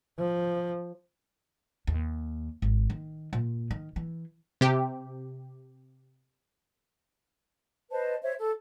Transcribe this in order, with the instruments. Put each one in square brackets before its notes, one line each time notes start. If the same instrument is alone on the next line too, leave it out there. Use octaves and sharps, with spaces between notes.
[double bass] F3
[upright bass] D#2
G#1
D#3
A#2
D#3
E3
[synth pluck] C3 G4
[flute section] B4 C5 D#5 A5
C5 C#5 E5
A4